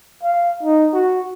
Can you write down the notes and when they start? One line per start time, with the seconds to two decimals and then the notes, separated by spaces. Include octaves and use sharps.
0.23 F5
0.63 D#4
0.94 F#4